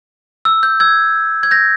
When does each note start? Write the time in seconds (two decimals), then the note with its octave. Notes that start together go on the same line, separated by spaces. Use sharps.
0.45 E6
0.63 G6
0.80 E6 G#6
1.43 G#6
1.51 G6 A#6